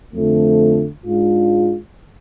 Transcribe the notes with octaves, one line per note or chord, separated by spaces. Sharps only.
F2 D3 F3 A3
G#2 G#3 D4 F4